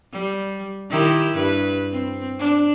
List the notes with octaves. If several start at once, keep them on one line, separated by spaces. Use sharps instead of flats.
G3
D#3 E4 G4
G2 B4
C4
D4